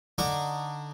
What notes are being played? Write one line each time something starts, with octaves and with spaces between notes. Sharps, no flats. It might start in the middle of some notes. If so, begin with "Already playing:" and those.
D3 D#4 C#6 D6